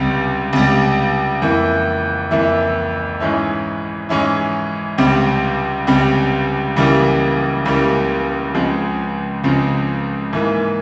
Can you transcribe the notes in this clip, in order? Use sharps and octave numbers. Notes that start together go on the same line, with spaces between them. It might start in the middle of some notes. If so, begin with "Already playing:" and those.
Already playing: C#2 C3 G3
C#2 C3 G3
F2 E3 A#3 E4
F2 E3 A#3 E4
G#2 E3 G#3 C#4 E4
G#2 E3 G#3 C#4 E4
C#2 C3 G3 C4
C#2 C3 G3 C4
C#2 C#3 E3 G3 A#3
C#2 C#3 E3 G3 A#3
C#2 C#3 F3 G#3 C4
C#2 C#3 F3 G#3 C4
G#2 E3 A#3